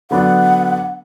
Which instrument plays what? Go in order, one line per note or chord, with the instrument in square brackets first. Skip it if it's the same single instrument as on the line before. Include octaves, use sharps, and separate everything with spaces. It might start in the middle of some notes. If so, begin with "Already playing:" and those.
[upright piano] D3 F#3 B3 D4 [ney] F#5